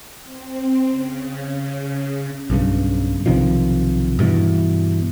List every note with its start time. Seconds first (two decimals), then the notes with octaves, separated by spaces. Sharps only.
0.23 C4
0.92 C#3
2.50 B1 G2 C#3
3.26 B1 C3 D#3 F3
4.19 G2 B2 E3